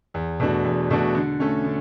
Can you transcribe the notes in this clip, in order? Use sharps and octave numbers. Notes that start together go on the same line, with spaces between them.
E2
B2 A3 D4 F#4
E2
B2 A3 D4 F#4
D3
A3 C#4
D3